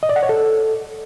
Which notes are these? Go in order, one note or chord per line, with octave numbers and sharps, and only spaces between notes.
D#5
D5
F#5
C#5
A4